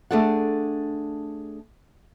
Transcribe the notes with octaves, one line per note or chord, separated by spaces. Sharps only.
A3 D4 G#4 A4 D5 F#5